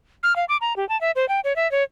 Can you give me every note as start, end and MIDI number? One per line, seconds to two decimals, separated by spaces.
0.23 0.35 89
0.36 0.45 77
0.49 0.57 86
0.61 0.76 82
0.76 0.87 67
0.89 0.99 81
1.01 1.11 76
1.16 1.28 72
1.29 1.40 79
1.44 1.55 73
1.56 1.70 76
1.71 1.83 73